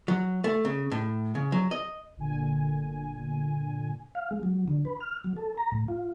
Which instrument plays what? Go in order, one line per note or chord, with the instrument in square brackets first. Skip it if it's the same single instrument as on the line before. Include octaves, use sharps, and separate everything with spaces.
[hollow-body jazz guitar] F#3
A3
C#3
A2
C#3
F#3
D#5
[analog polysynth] G1 A#2 D3 G#5
[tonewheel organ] F5
G#3
F#3
D3
B4
F6
F#3
A4
A#5
A2
F4